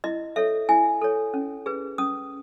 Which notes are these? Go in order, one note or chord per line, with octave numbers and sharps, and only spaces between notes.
E4 D#5
A4 C#5 E5
E4 G#5
A4 C#5
C#4
G#4 B4
C#4 D#6